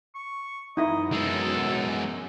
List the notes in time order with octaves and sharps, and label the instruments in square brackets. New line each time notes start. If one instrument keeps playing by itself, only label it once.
[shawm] C#6
[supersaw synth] F#2 [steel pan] D#4 E4 [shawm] D#5
[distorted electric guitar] G#3 B3 [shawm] A4